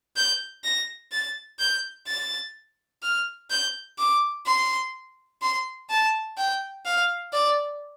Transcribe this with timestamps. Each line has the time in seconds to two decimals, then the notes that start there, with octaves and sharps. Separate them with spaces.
0.16 G6
0.64 A#6
1.12 A6
1.59 G6
2.08 A6
3.03 F6
3.50 G6
3.99 D6
4.47 C6
5.42 C6
5.90 A5
6.38 G5
6.86 F5
7.33 D5